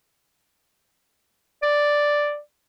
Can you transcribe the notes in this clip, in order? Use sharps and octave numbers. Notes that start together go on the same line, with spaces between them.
D5